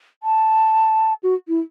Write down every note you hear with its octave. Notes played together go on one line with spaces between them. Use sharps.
A5
F#4
E4